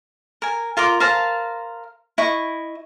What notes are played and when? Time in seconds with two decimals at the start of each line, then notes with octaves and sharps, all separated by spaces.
0.42 A#4 G#5
0.77 F4 A#4 C6 D6
1.00 A#4 C5 F5 A5
2.18 E4 D#5 C#6